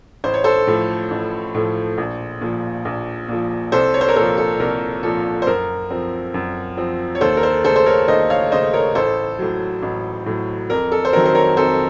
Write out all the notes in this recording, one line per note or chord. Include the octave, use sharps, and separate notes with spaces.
A1 C5
C#5
A4 C5
A2 F3 A3
A1
A2 F3 A3
A#1
A#2 F3
A#1
A#2 F3
C2 A4 C5
C#5
C5
A#4 C#5
A#2 F3 A4 C5
A4
C2 A#4
A#2 F3 A4
C5
F#2 A#4
F3 C4
F#2
F3 C4
C#5
D#2 A4 C5
A#4
A4 C5
C#3 A3 A4 C5
C5
A#4 C#5
D#2 C5 D#5
C#5 F5
C#3 A3 C5 D#5
A#4 C#5
A1 A4 C5
A2 F#3
A1
A2 F#3
F2 A#4
A4
C5
D#3 F#3 C4 A#4
C5
A#4 C#5
F2 A4 C5